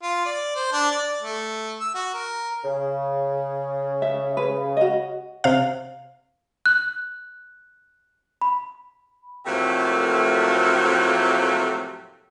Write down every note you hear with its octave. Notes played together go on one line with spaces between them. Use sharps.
F4
D5
C5
D4
D5
A3
E6
F#4
A#4
C#3
E5
B4
F#4 D#5
C3 F5
F#6
B5
A2 C3 F3 F#3 A3 A#3